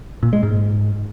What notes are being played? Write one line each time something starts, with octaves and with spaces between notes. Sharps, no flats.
A#2
G#3
G#2